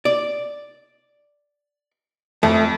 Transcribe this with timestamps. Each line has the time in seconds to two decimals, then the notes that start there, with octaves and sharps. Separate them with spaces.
0.05 D5
2.43 F2 A3